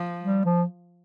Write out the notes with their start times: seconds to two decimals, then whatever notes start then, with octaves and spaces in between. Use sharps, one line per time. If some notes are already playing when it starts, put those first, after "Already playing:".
Already playing: F3
0.23 G3
0.45 F3